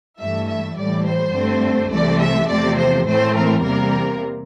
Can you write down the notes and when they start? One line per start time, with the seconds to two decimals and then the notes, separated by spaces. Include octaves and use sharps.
0.18 G2 E3 A3 E5
0.47 E5
0.76 A2 E3 G3 D5
1.05 C5
1.33 G2 D3 A3 C4
1.90 C2 C3 E3 A3 D5
2.20 E5
2.48 E2 C3 F3 A3 D5
2.77 C5
3.06 A2 E3 A3 C4 C5
3.34 A#4
3.63 E2 C3 G3 A#3 A#4